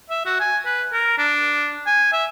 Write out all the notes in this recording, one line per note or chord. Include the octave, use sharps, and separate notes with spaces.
E5
F#4
G#5
B4
A#4
D4
G#5
E5